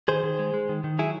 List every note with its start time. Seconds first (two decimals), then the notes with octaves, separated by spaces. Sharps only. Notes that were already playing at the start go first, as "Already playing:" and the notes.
0.08 D#3 G#4 C5
0.24 D#3
0.39 G#3
0.54 G#3
0.69 D#3
0.84 D#3
0.99 F#3 E4 G#4